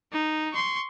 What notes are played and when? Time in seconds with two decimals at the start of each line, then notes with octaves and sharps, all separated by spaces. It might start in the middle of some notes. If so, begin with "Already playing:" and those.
0.12 D#4
0.53 C6 C#6